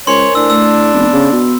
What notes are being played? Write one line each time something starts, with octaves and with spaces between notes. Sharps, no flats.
C#2 A#4 C5 C#5 G#5 C6
A2 D4 E6
A3 E6
F1 B3
C#3
B2